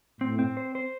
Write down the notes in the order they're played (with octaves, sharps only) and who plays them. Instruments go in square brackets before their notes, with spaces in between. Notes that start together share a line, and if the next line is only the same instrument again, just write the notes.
[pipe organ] A2 [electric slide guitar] C4
[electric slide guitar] C4
C5
C5